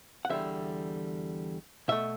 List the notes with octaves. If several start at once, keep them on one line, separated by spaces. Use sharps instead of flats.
F#5
E2 D3 G3 E5
B2 A3 E5